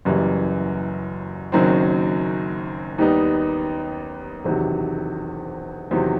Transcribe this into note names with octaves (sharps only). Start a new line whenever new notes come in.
F#1 F#2 E3 G3
F#1 F#2 D#3 F#3 C4
D#2 D#3 G3 B3 D#4
E1 E2 C3 D#3 F#3
E2 C3 D#3 F#3 C4